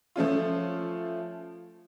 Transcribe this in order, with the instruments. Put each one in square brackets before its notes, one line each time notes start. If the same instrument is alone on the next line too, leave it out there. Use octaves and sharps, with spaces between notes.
[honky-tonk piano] F3 A3 C#4 F4